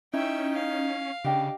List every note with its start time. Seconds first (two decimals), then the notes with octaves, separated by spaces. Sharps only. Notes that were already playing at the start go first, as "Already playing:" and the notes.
0.14 C#4 D#4 E4 E5 G5
0.52 F5
1.24 C#3 D4 G4 D#5 G5